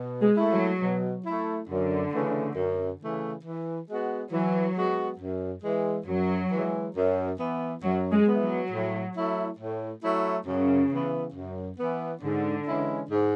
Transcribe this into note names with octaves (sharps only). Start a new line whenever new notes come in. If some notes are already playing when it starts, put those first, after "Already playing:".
Already playing: B2
G#3
A3 E4
F#3
B2
A3 E4
F#2 D3
C#3 E3 A3
F#2
C#3 E3 A3
E3
G#3 B3 F#4
E3 F#3
G#3 B3 F#4
F#2
E3 G#3
F#2 F#3
E3 G#3
F#2
E3 B3
F#2 F#3
G#3
B3
E3
F#3
A2
F#3 A3 E4
A2
F#3 A3 E4
F#2 C#3
E3 B3
F#2
E3 B3
G#2 D3
E3 G#3 C#4 E4
G#2